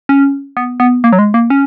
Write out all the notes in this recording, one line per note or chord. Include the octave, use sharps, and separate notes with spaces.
C#4
B3
B3
A#3
F#3
G#3
A#3
C#4